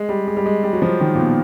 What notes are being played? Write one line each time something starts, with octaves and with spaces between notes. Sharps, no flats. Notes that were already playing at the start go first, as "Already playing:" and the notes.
Already playing: G#3
G3
G#3
G3
G#3
G3
F#3
F3
D#3
A#2
B2